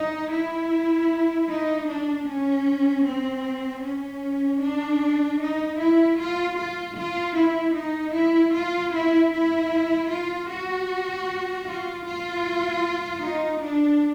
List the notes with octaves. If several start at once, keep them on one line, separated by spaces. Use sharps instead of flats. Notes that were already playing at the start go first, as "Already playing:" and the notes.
Already playing: D#4
E4
D#4
D4
C#4
C4
C#4
D4
D#4
E4
F4
F4
F4
E4
D#4
E4
F4
E4
E4
F4
F#4
F4
F4
D#4
D4